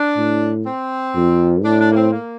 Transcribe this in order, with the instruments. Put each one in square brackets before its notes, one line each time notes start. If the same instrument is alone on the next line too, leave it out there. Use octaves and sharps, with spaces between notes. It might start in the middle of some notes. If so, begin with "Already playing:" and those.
Already playing: [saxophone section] D4
[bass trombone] A2
[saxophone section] C4
[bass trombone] F2
[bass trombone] A2 [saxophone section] D4
[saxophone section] D4
A#3
C4
A#3